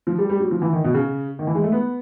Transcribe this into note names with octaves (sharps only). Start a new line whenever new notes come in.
F3
G3
G3
F#3
F3
E3
D#3
B2
C#3
D#3
E3
G#3
A3
B3